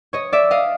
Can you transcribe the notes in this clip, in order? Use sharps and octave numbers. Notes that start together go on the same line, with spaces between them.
C#5 D#5
D5 E5
D#5 F5